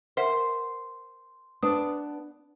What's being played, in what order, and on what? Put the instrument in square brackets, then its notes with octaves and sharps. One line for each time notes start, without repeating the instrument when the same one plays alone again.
[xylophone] A#4 E5 F#5 [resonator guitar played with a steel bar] C5
[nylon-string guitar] B3 D4 [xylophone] D#6